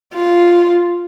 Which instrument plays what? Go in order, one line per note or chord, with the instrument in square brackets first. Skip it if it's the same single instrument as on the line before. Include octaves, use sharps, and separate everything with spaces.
[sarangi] F4